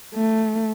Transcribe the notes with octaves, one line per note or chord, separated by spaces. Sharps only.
A3